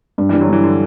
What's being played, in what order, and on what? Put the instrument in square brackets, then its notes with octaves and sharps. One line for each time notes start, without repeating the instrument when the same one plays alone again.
[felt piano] G2
[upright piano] E3 G3
[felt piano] G2
[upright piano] D3 F#3
[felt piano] G2 [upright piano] E3
[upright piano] D3